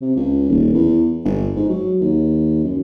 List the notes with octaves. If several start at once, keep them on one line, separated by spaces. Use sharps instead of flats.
C3
C#2
D#1
E2
G1
G#2
F#3
D#2
F#2